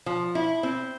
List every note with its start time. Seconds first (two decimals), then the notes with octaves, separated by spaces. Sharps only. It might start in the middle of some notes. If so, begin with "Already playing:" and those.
0.06 F3
0.35 E4
0.63 C4